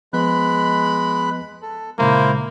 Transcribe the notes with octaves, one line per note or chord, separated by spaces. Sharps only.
F3 G#3 B3 B4 B5 F#6
A4
A#2 C#3 G#3 A#3 E4 C5